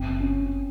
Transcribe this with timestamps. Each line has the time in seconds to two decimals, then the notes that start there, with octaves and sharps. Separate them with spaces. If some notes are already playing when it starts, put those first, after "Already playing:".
Already playing: F#1 C4
0.20 C#4